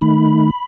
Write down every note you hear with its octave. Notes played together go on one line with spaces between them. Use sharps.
D#3 A3 D#4 B5